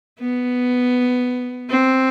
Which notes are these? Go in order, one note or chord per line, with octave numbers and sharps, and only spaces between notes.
B3
C4